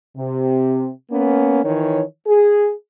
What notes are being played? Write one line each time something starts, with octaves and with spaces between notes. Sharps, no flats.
C3
A#3 B3 C#4
D#3 E3 C#5
G#4